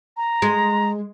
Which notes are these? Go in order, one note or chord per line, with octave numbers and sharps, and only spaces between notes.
A#5
G#3